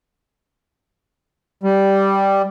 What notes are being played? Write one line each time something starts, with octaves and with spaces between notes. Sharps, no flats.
G3